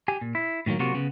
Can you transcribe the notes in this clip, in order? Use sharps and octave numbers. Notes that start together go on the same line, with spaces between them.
G4 G#5
A#2
E4
A2 D#3 E3 F#3 A#3
C3 F#3 A#3 F4 F#4
C#3 B3